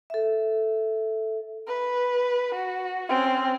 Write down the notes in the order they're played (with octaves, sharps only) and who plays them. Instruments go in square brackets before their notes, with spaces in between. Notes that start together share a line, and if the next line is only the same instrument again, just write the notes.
[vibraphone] A4 E5
[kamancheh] B4
F#4
C4 C#4